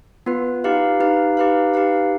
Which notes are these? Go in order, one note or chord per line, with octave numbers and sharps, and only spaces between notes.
B3 F4 B4
D#4 G4 B4 F5
D#4 G4 B4 F5
D#4 G4 B4 F5
D#4 G4 B4 F5